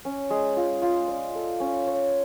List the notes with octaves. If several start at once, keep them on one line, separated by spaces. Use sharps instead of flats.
C#4
G#3
F4
F4
D5
A4
C#4
C#5